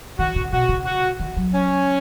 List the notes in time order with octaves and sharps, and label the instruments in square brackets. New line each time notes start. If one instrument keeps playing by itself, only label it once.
[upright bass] D#3 [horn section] F#4
[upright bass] C#3
[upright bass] B2 [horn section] F#4
[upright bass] C#3
[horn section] F#4
[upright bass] D#3
F#3
[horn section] C#4